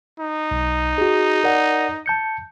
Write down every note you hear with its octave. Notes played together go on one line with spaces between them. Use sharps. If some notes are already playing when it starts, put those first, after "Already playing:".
D#4
B1
F#4 G#4
A#4 D5 F#5
A5 G6 C#7